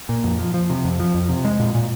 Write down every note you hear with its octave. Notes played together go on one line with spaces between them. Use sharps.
A#2
F2
F3
F3
C3
F2
F3
F2
C3
G#3
A#2
A#2